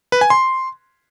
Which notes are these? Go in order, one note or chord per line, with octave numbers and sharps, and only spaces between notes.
B4
G#5
C6